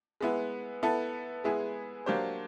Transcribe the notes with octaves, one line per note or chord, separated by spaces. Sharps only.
G#3 B3 E4
B3 E4 A4
G#3 B3 E4 G#4
F#3 A#3 D4 G4 C5